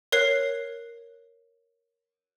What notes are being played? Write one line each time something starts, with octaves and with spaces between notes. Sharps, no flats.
A#4 C#5 F#6 C7